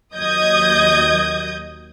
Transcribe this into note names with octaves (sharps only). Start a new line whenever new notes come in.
D#2 F#3 D#5 D#6 G6 G#6